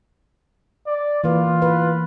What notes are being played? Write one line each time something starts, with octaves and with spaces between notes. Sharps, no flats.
D5
E3 A#3 F4 B4
B4